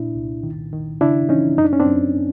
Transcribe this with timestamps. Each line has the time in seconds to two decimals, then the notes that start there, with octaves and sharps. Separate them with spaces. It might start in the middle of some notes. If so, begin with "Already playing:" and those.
Already playing: A#2 D4 E4
0.16 C2
0.43 D#3
0.73 D#3
1.01 C#3 D4 E4
1.29 E3 C#4 D#4
1.57 F#2 D#4
1.65 D4
1.73 C#4
1.80 C4 D4
1.87 F#2